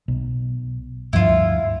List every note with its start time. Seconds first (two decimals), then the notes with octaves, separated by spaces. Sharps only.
0.08 B1
1.13 D2 G2 F3 E4 F4